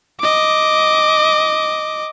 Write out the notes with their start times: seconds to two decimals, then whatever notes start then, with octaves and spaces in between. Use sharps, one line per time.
0.20 D#5 D6